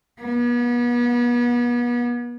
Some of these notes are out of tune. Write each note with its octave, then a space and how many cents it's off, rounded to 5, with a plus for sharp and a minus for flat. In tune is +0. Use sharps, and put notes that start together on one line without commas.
B3 -35